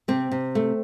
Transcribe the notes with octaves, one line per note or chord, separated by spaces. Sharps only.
C3 C4
C3
A3